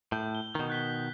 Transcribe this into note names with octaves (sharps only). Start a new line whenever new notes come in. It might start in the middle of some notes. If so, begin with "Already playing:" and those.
A2 G6
G7
B2 D#3
F#6 B6 G7